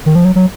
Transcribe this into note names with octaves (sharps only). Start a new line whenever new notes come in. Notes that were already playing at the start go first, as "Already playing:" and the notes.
D#3
F3
F#3
F#3